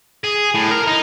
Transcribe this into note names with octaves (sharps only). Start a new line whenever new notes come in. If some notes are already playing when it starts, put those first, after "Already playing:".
G#4
A2
A#4
D#4